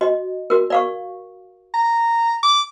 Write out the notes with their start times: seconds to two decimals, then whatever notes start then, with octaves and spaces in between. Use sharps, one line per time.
0.01 F#4 D#5
0.50 F#4 A#4
0.70 D5 F5 C#6
1.74 A#5
2.43 D6